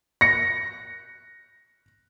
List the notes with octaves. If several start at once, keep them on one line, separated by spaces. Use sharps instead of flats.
A#6 C#7